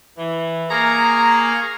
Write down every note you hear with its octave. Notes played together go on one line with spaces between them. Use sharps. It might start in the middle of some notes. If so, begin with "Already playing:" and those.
E3
A#3 G#4 G#5 A#5 C#6